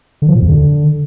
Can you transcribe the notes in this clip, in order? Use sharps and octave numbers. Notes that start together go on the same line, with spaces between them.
D3
F3
A#2
E2
D3